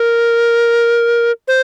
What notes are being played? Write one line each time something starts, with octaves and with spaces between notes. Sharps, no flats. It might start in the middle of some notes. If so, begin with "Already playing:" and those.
Already playing: A#4
C5